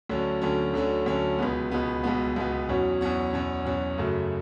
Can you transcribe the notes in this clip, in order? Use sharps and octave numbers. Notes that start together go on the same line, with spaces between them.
D2 D3 F#3 C#4
D2 D3 F#3 C#4
D2 D3 F#3 C#4
D2 D3 F#3 C#4
C#2 B2 G#3 B3
C#2 B2 G#3 B3
C#2 B2 G#3 B3
C#2 B2 G#3 B3
E2 B2 F#3 C#4 F#4
E2 B2 F#3 C#4 F#4
E2 B2 F#3 C#4 F#4
E2 B2 F#3 C#4 F#4
F#2 C#3 F#3 A3